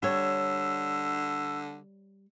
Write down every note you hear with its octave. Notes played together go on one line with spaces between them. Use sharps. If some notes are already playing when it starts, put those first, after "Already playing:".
D3 G3 C#5 E6